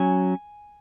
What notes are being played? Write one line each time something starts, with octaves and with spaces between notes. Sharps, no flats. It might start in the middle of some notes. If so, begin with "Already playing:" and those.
Already playing: F#3 C#4 G#5